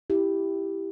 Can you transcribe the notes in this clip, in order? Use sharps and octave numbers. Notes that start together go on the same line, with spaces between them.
E4 G4